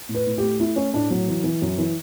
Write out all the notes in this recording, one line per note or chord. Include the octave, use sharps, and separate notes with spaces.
A2
B4
A2
A3 G4
A3 E4
A3 C#4
A2 D4
F#3
E3
E3
F#2
E3